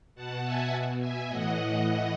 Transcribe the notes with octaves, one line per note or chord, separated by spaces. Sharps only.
B2 F#5 A5
E5 G#5
B2
E5 G#5
A2 E3 D#5 F#5